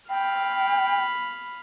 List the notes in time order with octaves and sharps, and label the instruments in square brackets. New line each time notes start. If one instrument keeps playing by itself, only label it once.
[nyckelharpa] F5 B5 [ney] G5